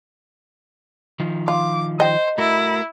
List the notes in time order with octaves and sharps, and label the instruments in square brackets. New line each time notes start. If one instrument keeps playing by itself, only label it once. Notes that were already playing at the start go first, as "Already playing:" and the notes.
[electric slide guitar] D#3 F3
[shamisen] F4 [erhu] D6
[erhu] C5 [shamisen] D#5 G5
[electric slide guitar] A3 F#4 A#4 [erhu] E4